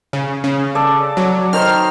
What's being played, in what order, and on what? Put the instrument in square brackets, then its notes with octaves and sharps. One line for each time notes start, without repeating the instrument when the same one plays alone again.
[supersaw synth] C#3
C#3
[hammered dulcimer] A4 D5
[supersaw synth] F#3
[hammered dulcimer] D#3 C5 [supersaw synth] F6